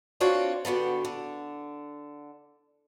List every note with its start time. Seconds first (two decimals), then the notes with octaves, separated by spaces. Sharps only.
0.20 C4 D4 F4 F#4 C#5 D5
0.65 D3 B3 F#4 G4
1.05 D3